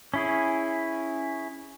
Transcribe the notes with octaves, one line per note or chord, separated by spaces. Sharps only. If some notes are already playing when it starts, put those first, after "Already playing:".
C#4 E4 G#4